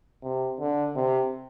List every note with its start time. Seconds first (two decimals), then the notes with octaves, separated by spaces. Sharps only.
0.23 C3
0.59 D3
0.96 C3